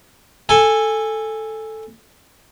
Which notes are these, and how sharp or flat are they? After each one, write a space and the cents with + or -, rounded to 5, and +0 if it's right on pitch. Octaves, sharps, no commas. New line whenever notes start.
A4 +0 G#5 -10